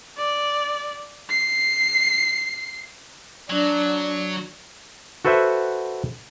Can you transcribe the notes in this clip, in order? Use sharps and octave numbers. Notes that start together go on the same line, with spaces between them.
D5
C7
F#3 D4
F#4 A4 B4 C5 E5 F#5